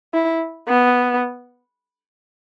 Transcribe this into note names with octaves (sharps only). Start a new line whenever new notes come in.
E4
B3